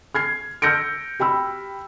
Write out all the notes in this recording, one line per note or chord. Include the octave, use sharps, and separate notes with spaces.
F6 G#6 C7
E6 F6 G6 A#6 C#7 D7
G4 G5 B5 E6